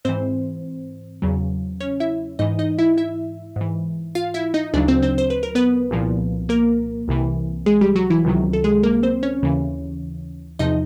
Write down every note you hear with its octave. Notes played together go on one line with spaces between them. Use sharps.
G#2 E3 C4 C5
E2 C#3 F#3
C#4 C#5
E4 E5
G#2 E3 D#4 D#5
D#4 D#5
E4 E5
E4 E5
G#2 E3
F4 F5
E4 E5
D#4 D#5
D2 C#3 F#3 D4 D5
C4 C5
C4 C5
C5
B4
A#4
B3 B4
C2 A#2 F3
A#3 A#4
C2 C3 E3
G#3 G#4
G3 G4
F#3 F#4
E3 E4
C#2 C3 D#3 F#3
A4
G#3 G#4
A#3 A#4
C4 C5
C#4 C#5
D#2 C#3 E3
E2 C3 F3 D#4 D#5